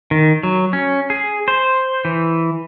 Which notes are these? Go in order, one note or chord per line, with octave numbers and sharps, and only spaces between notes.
D#3
F#3
C#4
G#4
C5
E3